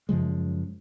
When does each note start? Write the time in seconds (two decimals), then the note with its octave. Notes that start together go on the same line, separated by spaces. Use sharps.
0.09 F#2 C#3 F3 G#3